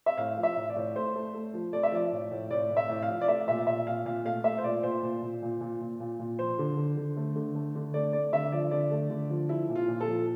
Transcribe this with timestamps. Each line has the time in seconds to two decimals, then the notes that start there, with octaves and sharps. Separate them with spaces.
0.06 E5
0.18 A2 F5
0.37 F3
0.43 E5
0.56 A2
0.70 D5
0.76 A2
0.96 A3 C5
1.15 A3
1.34 A3
1.54 F3
1.73 A3 D5
1.83 E5
1.92 F3 D5
2.12 A2
2.31 A2
2.50 A2 D5
2.70 A2
2.77 E5
2.89 A2
3.03 F5
3.09 F3
3.21 D5
3.28 A3 E5
3.48 A#2 E5
3.67 A#2 E5
3.87 A#2 F5
4.05 A#2 F5
4.25 A3 F5
4.44 A3 E5
4.58 C5
4.64 A#2 D5
4.83 A#2 C5
5.03 A#2
5.22 A#2
5.42 A#2
5.61 A#2
5.81 A#2
6.00 A#2
6.19 A#2
6.39 F3 C5
6.59 D3
6.77 D3
6.97 D3
7.17 A3
7.36 D3
7.55 A3
7.75 D3
7.94 A3 D5
8.13 A3 D5
8.33 D3 E5
8.52 F3 D5
8.71 D3 D5
8.91 A3
9.10 D3
9.30 F3
9.49 F3 E4
9.69 A#2
9.75 F4
9.88 A#2
10.01 A4
10.08 F3